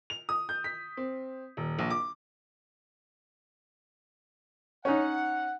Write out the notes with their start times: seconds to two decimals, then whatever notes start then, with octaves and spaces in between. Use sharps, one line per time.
0.10 F7
0.29 D#6
0.49 G6
0.64 B6
0.97 C4
1.57 D#1
1.79 A#1
1.90 D6
4.85 C#4 D#4 F#5